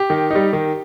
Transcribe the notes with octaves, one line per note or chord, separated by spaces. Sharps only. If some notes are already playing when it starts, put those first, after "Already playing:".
Already playing: G4
D#3
G3 D#4
D#3